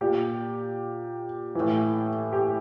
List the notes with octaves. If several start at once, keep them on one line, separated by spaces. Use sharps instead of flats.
A#2 G4
A2 E3
G4